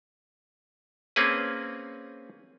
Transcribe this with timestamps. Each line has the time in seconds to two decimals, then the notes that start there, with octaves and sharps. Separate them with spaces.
1.16 A#3 C4 C#4 G#4 B4